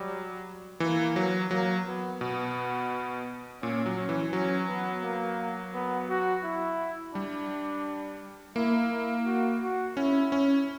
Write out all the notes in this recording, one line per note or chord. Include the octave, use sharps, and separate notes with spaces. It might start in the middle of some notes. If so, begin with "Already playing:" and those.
Already playing: F#3 G3
E3 A#3
F#3
F#3 A#3
B3
B2 B3
A#2 C#4
F#3
C#4
E3
F#3 C#4
B3
A#3
B3
F#4
E4
G3 D4
A#3 E4
E4
F#4
F#4
C#4 E4
C#4